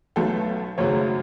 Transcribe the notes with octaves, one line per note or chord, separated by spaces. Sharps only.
B1 B2 F#3 A3 A4
G#1 F#2 C#3 F#3 A3 C#5